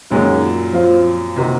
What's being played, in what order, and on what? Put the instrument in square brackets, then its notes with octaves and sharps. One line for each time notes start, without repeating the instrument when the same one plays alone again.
[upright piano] F#2 A#2 [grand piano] D#3 G#3 C#4 F#4
[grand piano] F3 C4 F4
[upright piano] C3 [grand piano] D#3 A#3 D#4 F#4